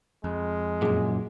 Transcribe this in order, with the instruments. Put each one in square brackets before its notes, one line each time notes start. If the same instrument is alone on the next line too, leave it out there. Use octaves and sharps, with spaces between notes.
[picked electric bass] F2 [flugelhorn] G#3
[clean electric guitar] F#2 A#2 [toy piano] G#4 G#5